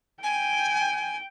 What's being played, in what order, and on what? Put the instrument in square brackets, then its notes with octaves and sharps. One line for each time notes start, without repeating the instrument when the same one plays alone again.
[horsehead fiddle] G5 [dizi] G#5